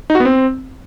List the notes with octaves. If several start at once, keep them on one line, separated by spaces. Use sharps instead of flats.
D#4
F#4
B3
C4